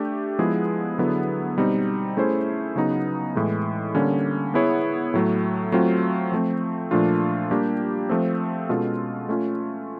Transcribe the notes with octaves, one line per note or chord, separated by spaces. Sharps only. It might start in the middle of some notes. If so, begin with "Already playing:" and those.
Already playing: A3 D4 G4
F3 G#3 B3 E4 G#4
D3 F#3 B3 E4 G#4
B2 G3 C4 D#4
A3 C#4 E4 G#4 C5
C#3 F#3 B3 D#4
A2 E3 G#3
D3 G3 A#3 C#4
B3 E4 G#4 C#5
A2 F#3 A3
F#3 A3 C4 F4
F3 A3 C4
A#2 F3 A3 D4 F4
G3 A#3 D4 G4
F3 A3 C4
B2 G#3 C#4 F4 A4
A3 C#4 F4